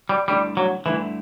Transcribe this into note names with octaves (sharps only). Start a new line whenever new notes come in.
G3
G2 D3 G3 A3 E4
F#3
G2 D3 E3 A3 E4